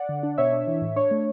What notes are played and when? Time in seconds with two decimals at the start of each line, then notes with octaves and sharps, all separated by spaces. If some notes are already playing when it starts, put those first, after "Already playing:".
Already playing: D5 F#5
0.09 D3
0.23 D4
0.38 B2 C#5 E5
0.53 D4
0.67 E3
0.82 A2
0.96 D4 C#5
1.11 A3